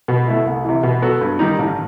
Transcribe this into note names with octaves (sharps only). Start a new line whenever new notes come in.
B2
A3 E4
C2
C3 E3
B2
F#3 B3 F#4 A4
G2
D#3 G3 D#4
A1